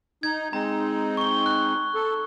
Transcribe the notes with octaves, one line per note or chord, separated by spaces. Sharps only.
D#4 G#6
G#3 C4 D#4 A#5
C#6 G7
F#6
A4